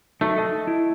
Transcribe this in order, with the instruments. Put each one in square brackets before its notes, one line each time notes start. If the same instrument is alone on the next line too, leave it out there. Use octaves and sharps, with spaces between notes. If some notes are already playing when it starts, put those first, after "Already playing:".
[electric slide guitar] F#3 D#4 A4 [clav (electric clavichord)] A3
[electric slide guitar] A4 D#5 A5
E4